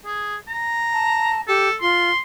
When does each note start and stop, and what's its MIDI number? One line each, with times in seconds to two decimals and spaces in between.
0.05 0.36 68
0.48 1.42 82
0.93 1.41 81
1.48 1.69 67
1.48 1.74 69
1.81 2.10 65
1.81 2.19 84